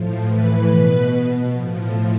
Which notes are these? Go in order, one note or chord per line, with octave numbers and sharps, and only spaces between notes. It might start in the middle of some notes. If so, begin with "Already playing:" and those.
Already playing: A2 F3
A2 E3 B4
B2 B4
B2
A2 F3